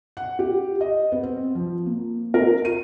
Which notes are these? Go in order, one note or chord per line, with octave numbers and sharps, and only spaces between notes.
F#5
G4
D#5
B3
C4
F3
A#3
A#4
D#7